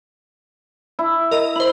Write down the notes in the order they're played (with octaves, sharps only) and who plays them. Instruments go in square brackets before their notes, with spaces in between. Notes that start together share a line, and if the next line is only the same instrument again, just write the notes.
[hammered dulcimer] E4
[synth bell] A#4 D#5 E6
[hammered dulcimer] E4 [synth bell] C5 F#7